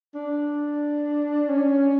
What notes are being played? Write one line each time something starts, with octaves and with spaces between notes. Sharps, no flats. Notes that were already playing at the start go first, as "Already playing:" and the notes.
D4
C#4